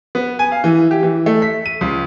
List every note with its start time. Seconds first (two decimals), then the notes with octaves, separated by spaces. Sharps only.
0.15 B3
0.39 G#5
0.52 F5
0.64 E3
0.91 G4
1.03 E3
1.26 A3
1.42 B6
1.66 D#7
1.81 C#2